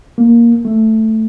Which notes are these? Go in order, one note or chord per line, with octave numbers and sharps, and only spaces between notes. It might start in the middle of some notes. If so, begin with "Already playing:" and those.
A#3
A3